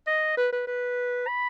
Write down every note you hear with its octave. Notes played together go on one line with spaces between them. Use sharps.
D#5
B4
B4
B4
B5